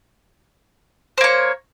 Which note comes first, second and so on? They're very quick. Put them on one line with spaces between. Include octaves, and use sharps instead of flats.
C5 A#3 C#5